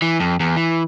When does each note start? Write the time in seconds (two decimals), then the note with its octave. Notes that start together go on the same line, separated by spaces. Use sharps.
0.02 E3
0.20 F2
0.40 E2
0.56 E3